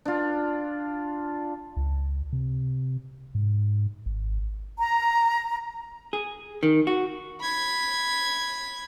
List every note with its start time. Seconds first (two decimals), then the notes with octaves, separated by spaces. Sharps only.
0.05 D4 F4
1.77 C#2
2.33 C3
3.35 G#2
4.06 G#1
4.78 A#5
6.13 G#4
6.63 D#3
6.87 F#4
7.42 B5 G#6